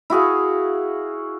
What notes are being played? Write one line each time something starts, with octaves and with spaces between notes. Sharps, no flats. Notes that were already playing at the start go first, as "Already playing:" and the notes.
E4 F#4 G#4 F5